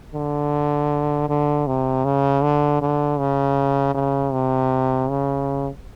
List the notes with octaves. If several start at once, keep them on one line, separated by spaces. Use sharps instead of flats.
D3
D3
C3
C#3
D3
D3
C#3
C#3
C3
C#3